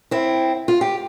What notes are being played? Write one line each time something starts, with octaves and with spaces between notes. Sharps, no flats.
C4 E4
F4
G4